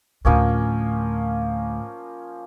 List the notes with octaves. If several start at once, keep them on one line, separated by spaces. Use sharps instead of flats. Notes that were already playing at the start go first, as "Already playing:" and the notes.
D2 A2 F3 A#3 C#4